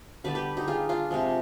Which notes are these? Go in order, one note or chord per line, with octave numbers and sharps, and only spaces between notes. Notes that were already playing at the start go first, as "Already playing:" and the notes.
D3 G3 B3 B4 D5
G4 B4
D#4 G4
F4 G#4
D4 F4
C3 F3 G#3